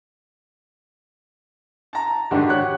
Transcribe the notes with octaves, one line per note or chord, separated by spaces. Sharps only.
A5 A#5
G#2 D3 D#3 D4 F#4 G4
F#4 G4 C#5 F#6